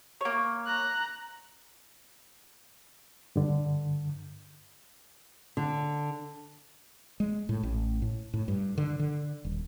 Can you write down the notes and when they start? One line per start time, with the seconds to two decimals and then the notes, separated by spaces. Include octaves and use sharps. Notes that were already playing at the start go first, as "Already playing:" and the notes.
0.21 A#3 C#5
0.66 A#5 F#6
3.36 G2 D3
5.57 D3
7.20 G#3
7.49 A2
7.63 A1
8.02 A2
8.34 A2
8.48 G2
8.78 D3
8.99 D3
9.45 D#1